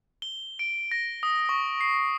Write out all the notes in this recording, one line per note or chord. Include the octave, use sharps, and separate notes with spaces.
G7
D7
A#6
D#6
C#6
C7